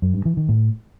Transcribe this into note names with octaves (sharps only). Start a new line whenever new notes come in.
F#2
G2
E3
D#3
A2